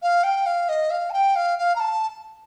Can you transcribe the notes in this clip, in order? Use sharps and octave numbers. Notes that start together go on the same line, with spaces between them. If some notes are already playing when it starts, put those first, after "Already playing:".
F5
G5
F5
D#5
F5
A5
G5
F5
F5
A#5
A5